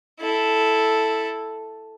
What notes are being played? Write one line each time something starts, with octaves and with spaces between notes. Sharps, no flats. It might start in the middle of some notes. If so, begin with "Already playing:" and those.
E4 A4